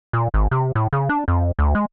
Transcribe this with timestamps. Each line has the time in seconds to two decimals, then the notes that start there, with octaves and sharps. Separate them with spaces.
0.13 A#2
0.34 G#1
0.51 C3
0.75 A2
0.93 C#3
1.09 D4
1.28 F2
1.59 D2
1.75 G#3